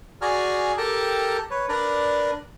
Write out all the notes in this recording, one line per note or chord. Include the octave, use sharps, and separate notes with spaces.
F#4 G#4 D5 G#5 A#5 F6
G4 A4 A#4 G5 A5 A#5
B4 C#5
D4 A#4 B4 D5 A#5